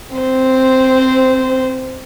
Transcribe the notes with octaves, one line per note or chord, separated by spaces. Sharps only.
C4 C5